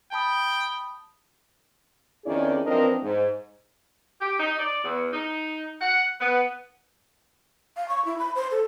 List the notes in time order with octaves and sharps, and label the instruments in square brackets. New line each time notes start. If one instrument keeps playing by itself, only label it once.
[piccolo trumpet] G5 [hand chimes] A5 B5 D#6
[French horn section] F2 D#3 C#4 E4 G#4 D5
E3 F3 C4 D4 A#4 D#5
G#2
[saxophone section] G4
D#4
D5
E2
D#4
F#5
B3
[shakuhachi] F5
C#6
E4
B5
C5
A4